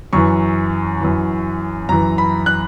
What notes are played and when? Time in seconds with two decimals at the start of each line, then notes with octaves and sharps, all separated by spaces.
0.13 F#2 E3 C#6
1.01 F#2 E3
1.89 F#2 E3 A#5
2.18 B5
2.46 F#6